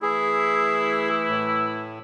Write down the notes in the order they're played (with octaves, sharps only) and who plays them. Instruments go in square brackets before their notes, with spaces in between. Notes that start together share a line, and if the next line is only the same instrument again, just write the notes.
[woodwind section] E3 A3 E4 [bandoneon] G#4
[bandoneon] A2